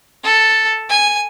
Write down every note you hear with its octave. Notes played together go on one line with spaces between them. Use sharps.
A4
G#5